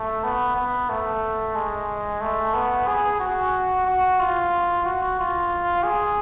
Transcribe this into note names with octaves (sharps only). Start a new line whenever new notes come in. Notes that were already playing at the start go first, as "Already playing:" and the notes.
Already playing: A3
B3
B3
A3
G#3
A3
B3
G#4
F#4
F#4
F4
F#4
F4
G#4